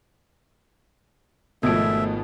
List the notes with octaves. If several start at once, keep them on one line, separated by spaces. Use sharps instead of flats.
G#1 B2 F3 A3 G#4 E5 D7